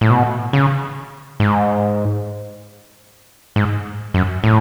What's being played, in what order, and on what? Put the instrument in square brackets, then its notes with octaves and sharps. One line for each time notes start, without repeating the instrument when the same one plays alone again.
[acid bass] A2
B2
C#3
G#2
G#2
F#2
A2